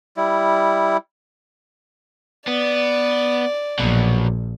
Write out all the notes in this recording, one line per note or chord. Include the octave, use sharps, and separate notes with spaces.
G3 E4
B3 D5
A#1 B2 F#3